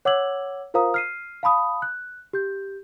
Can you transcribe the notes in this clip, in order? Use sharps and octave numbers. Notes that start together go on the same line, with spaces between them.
C#5 F#5 D6 E6 G#6 F#7
F4 A#4 C5 F5 A#5 D#6
F6 C7 D#7
F5 A5 B5 D#6
F#6
G4 G6